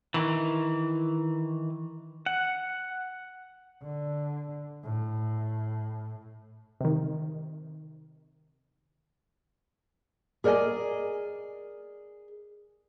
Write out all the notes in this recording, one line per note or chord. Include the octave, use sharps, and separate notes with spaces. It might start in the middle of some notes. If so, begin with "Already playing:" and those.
D#3 E3
F#5
D3
A2
C3 D#3
G#4 A#4 D5 D#5 G#5